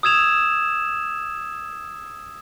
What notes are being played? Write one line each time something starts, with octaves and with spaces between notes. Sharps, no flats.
D#6 E6 G#6 E7 F7